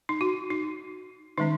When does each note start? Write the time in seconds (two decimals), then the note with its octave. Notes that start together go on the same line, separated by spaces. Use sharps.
0.09 D#4
0.21 F#4
0.50 D#4
1.38 D#3 G#3 C#4 D#4